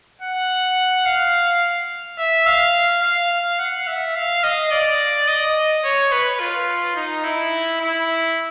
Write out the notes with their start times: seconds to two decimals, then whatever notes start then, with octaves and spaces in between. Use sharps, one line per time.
0.21 F#5
1.06 F5
2.18 E5
2.46 F5
3.03 F5
3.59 F#5
3.87 E5
4.15 F5
4.43 D#5
4.71 D5
5.28 D#5
5.84 C#5
6.12 B4
6.40 F4
6.96 D#4
7.24 E4
7.81 E4